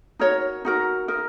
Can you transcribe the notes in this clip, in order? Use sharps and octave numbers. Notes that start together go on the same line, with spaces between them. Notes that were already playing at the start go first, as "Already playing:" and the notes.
D#4 F#4 A#4 C#5
D#4 F#4 A#4
D#4 A#4